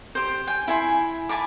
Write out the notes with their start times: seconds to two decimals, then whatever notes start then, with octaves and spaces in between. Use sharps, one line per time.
0.15 G4 C5
0.47 G5 G#5
0.68 E4 G#5 C6
1.29 G#5 A5 B5 D6